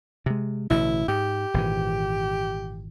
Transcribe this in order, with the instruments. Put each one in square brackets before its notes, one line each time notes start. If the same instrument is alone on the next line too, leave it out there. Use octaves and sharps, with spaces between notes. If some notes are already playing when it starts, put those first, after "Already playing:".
[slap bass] C3 G#3
[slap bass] A1 B2 D3 [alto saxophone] E4
[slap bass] G#2 [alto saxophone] G4
[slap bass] G#1 A#2 E3